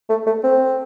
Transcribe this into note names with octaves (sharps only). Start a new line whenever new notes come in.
A3
A3
C4